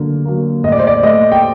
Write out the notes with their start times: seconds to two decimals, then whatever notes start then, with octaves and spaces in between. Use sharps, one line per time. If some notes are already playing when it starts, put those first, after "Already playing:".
Already playing: D3 F#3 A#3
0.25 F#3 A#3
0.64 A2 D#5
0.72 D5
0.79 C5
0.87 D5
1.03 A3 D#5
1.32 G5